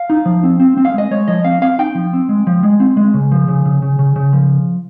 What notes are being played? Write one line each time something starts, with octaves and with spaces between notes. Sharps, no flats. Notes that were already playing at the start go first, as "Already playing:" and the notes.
Already playing: F5
D#4
F3
C4
C4
C4
F5
G#3 D#5
G#3 C#5
F3 D#5
C4 F5
C4 F5
D#4 G5
F3
C4
G#3
F3
G#3
C4
G#3
C#3
F3
C#3
C#3
C#3
C#3
C#3
F3